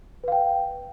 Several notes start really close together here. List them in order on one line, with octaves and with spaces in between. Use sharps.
B4 F5 G5